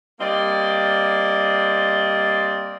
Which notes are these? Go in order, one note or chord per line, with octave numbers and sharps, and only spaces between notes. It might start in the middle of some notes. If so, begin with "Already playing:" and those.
G3 A#3 C4 D5 D#5